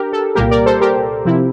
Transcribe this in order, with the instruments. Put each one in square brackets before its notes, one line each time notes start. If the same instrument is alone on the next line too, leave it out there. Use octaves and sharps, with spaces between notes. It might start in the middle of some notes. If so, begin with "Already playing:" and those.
Already playing: [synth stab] D4 G4 A#4
A4
C2 A#2 G3 A#3 G4 A#4
A#4 D5
A4 C5
G4 A#4
C3 F3 C4 E4